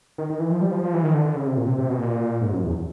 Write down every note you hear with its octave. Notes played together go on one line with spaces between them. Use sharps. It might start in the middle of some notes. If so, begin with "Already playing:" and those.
D#3
D#3
E3
F3
G3
F3
F3
E3
D#3
D3
D3
C#3
C3
A#2
C3
C3
B2
A#2
G#2
F#2
E2